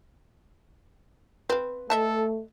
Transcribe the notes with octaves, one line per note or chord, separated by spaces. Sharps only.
C4 B4 F5
A3 A4 D#5 E5 A5